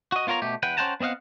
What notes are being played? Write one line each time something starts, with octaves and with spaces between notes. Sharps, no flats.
F#4 D#5
B3 F4 A#4 C#5 A#5
B2 A3 G4
E2 B4 F#5 G5
C#4 C5 F#5 G5 A5 A#5
B3 C4 D#5 F5 F#5